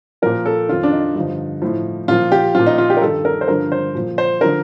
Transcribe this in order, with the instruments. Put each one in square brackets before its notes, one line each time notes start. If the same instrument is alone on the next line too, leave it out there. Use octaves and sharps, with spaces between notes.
[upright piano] A#2 F3 A#4
A4
F2 D#3 F4
D4
D#4
G2 D3 F3
A2 F3
A#2 F3 F4
G4
A#2 F3 F4
D#4
F4
G4
A#4
G2 D#3 A4
A#4
C5
G2 D3 F3 A#4
C5
A#2 F3
C5
D3 F3 A#4